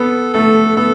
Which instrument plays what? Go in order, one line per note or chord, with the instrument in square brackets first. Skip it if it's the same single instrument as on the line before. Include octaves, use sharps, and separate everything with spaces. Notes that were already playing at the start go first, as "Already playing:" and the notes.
Already playing: [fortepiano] B3 [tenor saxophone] A4
[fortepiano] A3 [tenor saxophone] A4
[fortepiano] B3 [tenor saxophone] A4